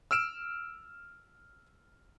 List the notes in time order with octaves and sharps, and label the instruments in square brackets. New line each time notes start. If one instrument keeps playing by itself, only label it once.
[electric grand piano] E6 F6 D7 E7